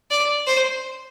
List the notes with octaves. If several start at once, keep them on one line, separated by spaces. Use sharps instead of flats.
D5
C5